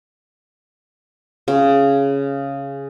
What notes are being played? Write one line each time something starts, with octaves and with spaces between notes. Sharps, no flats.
C#3